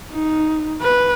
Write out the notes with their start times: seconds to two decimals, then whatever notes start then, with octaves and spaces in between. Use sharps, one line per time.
0.11 D#4
0.82 B4